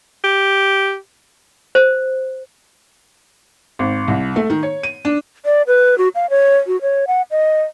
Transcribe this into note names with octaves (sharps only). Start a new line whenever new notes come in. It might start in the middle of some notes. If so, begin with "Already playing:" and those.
G4
C5
G#1
C2
A3
D#3
C#5
D#7
D4
D5
B4
F#4
F5
C#5
F#4
C#5
F#5
D#5